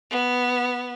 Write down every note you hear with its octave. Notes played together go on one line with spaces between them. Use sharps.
B3